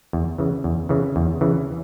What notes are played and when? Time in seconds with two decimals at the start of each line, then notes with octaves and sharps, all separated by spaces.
0.13 E2
0.38 C#3 E3
0.64 E2
0.89 C#3 E3
1.16 E2
1.41 C#3 E3